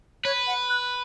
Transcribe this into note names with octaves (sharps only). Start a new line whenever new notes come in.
B4 C#5
F#5
F#6